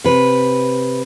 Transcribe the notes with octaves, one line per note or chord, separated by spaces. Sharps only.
C3 B4